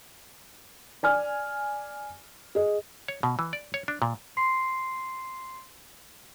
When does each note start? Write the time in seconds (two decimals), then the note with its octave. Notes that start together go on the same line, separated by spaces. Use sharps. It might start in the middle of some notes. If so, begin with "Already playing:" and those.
1.03 D5 G#5 F6
2.55 G#4 D#5
3.08 C#5
3.23 B2
3.39 E3
3.53 D5
3.74 C#5
3.88 D4
4.02 A#2
4.37 C6 C7